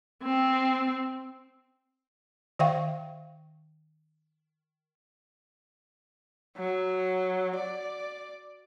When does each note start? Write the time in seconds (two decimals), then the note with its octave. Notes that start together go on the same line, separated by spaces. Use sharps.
0.23 C4
2.59 D#3 C5 E5 F5 G5 C#6
6.57 F#3
7.56 D5